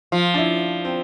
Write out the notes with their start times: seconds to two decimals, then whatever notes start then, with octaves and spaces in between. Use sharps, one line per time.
0.12 F3 F4
0.34 D4
0.38 E4
0.85 C4